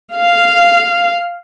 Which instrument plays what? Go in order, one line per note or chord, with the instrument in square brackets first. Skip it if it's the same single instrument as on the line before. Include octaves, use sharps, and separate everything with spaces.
[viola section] F5